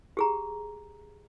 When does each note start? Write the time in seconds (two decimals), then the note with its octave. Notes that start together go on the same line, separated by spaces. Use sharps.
0.17 G4 G#4 A#5